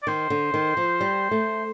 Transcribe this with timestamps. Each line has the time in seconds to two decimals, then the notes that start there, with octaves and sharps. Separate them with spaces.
0.03 D5
0.07 D#3 C5
0.30 D3
0.54 D#3
0.77 F3
1.01 G3
1.31 A3